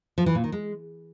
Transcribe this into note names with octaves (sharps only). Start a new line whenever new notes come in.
F3
E3
A#2
D#3
G#3